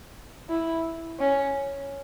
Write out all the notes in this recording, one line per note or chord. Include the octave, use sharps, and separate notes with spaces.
E4
C#4